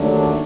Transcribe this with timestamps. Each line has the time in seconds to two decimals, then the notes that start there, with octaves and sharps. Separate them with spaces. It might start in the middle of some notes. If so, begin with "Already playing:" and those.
Already playing: D#2 D3 F#3 A3 D4